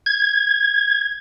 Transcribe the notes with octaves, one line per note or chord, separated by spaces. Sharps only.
G#6